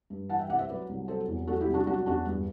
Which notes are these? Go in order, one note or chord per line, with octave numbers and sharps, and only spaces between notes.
G2
E3 F#5 A5
E5 G5
C2 D5 F#5
C5 E5
F#3 B4 D5
C2
F#3 A4 C5
E2
F#3 F#4 A4
E4 G4
C2
D4 F#4
F#3 D4 F#4
E2 D4 F#4
G2